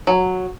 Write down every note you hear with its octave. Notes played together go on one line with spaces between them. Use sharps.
F#3